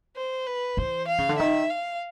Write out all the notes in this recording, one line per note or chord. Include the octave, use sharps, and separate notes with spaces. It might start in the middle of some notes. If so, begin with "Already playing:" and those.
C5
B4
E3 C5
F5
C#3
D3
D#3 E5
F5